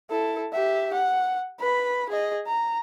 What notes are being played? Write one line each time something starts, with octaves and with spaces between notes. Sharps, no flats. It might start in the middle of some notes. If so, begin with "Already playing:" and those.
E4 A4
G4 E5
F#5
B4 B5
G#4 D#5
A#5